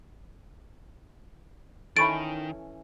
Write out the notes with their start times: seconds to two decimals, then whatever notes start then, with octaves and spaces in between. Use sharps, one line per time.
1.97 D#3 E3 C#4 A4 B5 C#6 A6 D7